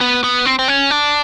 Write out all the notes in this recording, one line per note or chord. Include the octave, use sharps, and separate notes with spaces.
B3
B3
C4
C4
C#4
D4